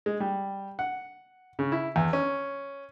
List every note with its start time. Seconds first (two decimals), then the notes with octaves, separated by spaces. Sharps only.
0.06 G#3
0.20 G3
0.79 F#5
1.59 C#3
1.72 E4
1.96 E2
2.13 C#4